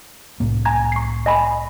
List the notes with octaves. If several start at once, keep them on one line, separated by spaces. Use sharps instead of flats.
C2 A2 A#3
G#5 A#5 G#6
C#6 C7
D#5 G#5 B5